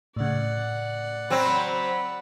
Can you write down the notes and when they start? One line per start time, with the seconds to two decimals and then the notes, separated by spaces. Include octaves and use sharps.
0.16 A2 C#3 D5 F#5
1.30 F#3 C4 B5